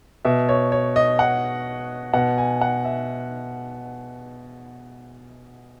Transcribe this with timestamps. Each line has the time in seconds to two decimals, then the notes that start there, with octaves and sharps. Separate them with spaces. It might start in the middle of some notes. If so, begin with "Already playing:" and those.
0.25 B2 E5
0.49 C#5
0.72 C#5
0.96 D#5
1.19 F#5
2.13 B2 F#5
2.38 G#5
2.61 F#5
2.85 E5